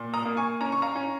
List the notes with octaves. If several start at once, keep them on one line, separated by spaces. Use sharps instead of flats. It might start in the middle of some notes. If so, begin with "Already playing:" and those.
Already playing: A#2
A#5 D#6
A#3
G#5 C#6
C#4 A#5
C#6
F5 A#5
C#4